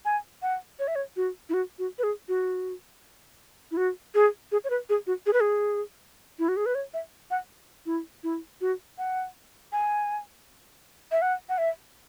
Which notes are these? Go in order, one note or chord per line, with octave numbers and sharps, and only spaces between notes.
G#5
F#5
C#5
E5
C#5
F#4
E4
F#4
F#4
B4
G#4
F#4
E4
F#4
G#4
G#4
C#5
B4
G#4
F#4
G#4
B4
G#4
E4
F#4
G#4
B4
C#5
E5
F#5
E4
E4
F#4
F#5
G#5
E5
F#5
F#5
E5